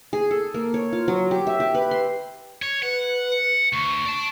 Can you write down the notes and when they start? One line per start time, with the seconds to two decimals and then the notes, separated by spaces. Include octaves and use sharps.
0.13 G#4
0.31 A4
0.54 A#3
0.74 C#5
0.93 F4
1.08 F#3
1.31 G4
1.47 E5
1.60 G4
1.75 B4
1.91 C6
2.62 C#5
2.83 B4 F#5
3.73 D2 C#6
4.06 D5 A5